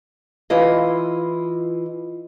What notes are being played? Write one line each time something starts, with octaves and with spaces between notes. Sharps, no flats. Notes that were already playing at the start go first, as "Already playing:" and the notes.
E3 E4 F4 D#5